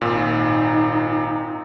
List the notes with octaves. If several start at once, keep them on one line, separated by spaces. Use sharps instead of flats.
G#1 A#2 D#4